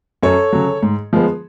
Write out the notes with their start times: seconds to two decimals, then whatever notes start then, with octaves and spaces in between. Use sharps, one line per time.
0.23 F#2 A4 C#5
0.53 C#3 F#3
0.83 G#2
1.13 F3 G#3 B3